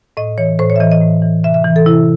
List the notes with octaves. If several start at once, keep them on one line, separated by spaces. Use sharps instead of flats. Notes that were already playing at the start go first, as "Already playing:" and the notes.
A2 D#5
E3 C#5
A2 C5
C#5
E5
E3 D#5
D#5
A2
E3
C3 E5
E5
E3
A4
C3 E4